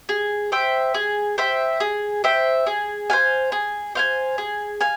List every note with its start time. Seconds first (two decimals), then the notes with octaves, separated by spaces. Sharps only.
0.09 G#4
0.52 C5 E5 G5
0.94 G#4
1.38 C5 E5 G5
1.80 G#4
2.24 C5 E5 G5
2.67 G#4
3.10 C5 F5 G#5
3.52 G#4
3.95 C5 F5 G#5
4.38 G#4
4.81 F5 G#5